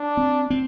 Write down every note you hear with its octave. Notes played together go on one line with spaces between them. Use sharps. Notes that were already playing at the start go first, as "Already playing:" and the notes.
Already playing: D4
C4
C4